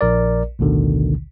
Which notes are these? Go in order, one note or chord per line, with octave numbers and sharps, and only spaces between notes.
A#1 A#4 D5
A1 D2 B2 D3 D#3